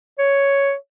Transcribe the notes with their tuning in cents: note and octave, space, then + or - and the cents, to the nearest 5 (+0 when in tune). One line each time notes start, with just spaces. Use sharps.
C#5 +5